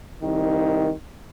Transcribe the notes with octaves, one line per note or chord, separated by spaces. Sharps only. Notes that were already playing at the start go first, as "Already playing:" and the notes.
C2 D#3